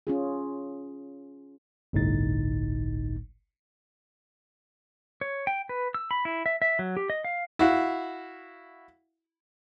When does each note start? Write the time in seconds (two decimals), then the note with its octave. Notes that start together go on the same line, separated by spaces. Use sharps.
0.07 C#4 F4 G#4
1.93 G1 C2 A2 D#4 A6
5.21 C#5
5.47 G5
5.69 B4
5.94 E6
6.11 B5
6.25 E4
6.46 E5
6.62 E5
6.79 F#3
6.97 G4
7.10 D#5
7.24 F5
7.59 E4 F#4 F5